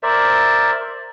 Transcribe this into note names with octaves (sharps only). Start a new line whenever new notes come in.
A#4 C5 D5 E5